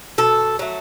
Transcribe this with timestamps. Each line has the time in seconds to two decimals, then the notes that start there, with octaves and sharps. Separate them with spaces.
0.18 B2 A4
0.59 F#3 A3